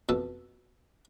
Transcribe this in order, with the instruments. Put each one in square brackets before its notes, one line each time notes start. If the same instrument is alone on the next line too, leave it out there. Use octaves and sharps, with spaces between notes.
[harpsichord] F2 B2 A4 A5